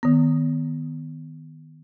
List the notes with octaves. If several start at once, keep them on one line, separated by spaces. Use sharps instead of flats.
D#3 B3